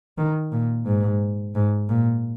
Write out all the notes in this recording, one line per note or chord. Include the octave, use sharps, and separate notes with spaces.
D#3
A#2
G#2
G#2
A#2